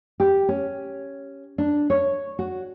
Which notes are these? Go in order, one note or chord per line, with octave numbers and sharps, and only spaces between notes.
G4
C#4
D4
C#5
F#4